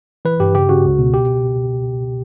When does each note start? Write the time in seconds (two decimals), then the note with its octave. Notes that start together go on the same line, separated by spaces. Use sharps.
0.25 E3 B4
0.40 G2 G4
0.54 C#3 G4
0.69 C#3 F#4
0.84 C#2
0.99 B2
1.14 G4